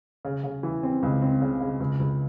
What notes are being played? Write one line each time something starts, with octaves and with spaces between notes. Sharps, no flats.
C#3
C#3
E3
C4
C#2
C4
C#3
C#3
C#2
C#2